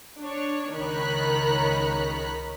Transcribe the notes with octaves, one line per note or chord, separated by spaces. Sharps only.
D4 C#5
C#2 D#3 C#5 A#5 B5 F#6